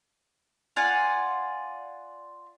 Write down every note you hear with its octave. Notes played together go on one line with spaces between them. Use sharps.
F4 D5 F#5 G#5